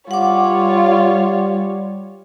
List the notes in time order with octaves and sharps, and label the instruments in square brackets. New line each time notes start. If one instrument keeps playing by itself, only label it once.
[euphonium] G3 [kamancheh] F4 C#5 [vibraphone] F#5 D6